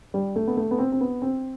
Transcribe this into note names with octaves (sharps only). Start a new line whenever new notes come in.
G3
A3
B3
A3
B3
C4
C4
B3
C4